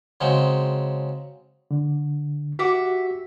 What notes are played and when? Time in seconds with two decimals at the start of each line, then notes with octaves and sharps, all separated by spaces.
0.21 C#3 F#3 G#3 C4
1.71 D3
2.59 F#4 G4 E5 F#5 D6